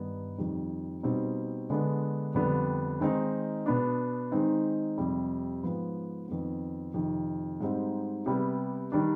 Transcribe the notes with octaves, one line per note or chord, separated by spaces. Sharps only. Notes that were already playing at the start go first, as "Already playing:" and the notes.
Already playing: G2 D#3 B3 D#4
F2 D#3 G3
B2 G3 C4 D#4
D3 G#3 B3 D4
F2 D3 G3 B3 D4
D#3 G#3 C4 D#4
B2 B3 D4
D#3 G#3 C4 D#4
F2 C3 G3
G#2 F3 B3
F2 D#3 B3
F2 C3 D#3
G#2 G3 C4 D#4
C3 G3 B3
D#3 G3 D4